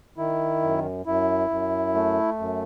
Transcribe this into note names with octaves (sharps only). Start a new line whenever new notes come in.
D#3 E4
F#2
F#2 E4
F#2
A3
F#2